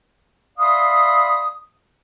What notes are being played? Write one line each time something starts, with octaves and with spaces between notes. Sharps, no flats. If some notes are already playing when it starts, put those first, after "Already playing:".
D5 E5 F5 B5 C6 D#6